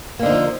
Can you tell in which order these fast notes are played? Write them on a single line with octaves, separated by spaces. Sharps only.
A#3 D3 D#4 F3